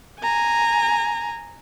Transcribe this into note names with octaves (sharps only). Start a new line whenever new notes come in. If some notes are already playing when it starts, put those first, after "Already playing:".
G#5 A#5